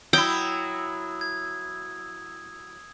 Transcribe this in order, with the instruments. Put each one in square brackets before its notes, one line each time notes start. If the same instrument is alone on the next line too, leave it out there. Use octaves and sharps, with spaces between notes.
[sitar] F#3 E4 [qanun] G5 [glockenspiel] D#6 E6 G#6
[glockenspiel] G#6